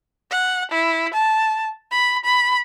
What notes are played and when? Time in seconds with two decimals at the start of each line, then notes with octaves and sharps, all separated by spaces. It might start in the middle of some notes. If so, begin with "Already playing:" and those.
0.31 F#5
0.71 E4
1.13 A5
1.91 B5
2.25 B5